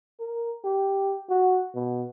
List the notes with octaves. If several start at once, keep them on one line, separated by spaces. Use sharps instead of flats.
A#4
G4
F#4
B2